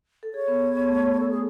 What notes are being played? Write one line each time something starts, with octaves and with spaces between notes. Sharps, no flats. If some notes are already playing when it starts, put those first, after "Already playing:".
A4
G#4 C#5
B3
B3
A3
B3
B3
A3 A4
G#4